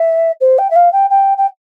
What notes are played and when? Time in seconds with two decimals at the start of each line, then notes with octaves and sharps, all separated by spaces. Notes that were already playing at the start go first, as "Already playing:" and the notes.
Already playing: E5
0.40 C5
0.58 G5
0.70 E5
0.75 F5
0.92 G5
1.10 G5
1.37 G5